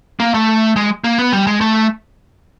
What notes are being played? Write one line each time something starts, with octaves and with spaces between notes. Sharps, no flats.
A#3
A3
G#3
A#3
B3
G3
G#3
A3